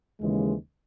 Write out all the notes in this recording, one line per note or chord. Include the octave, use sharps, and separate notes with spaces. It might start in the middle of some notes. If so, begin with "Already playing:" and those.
D#2 C#3 E3 G#3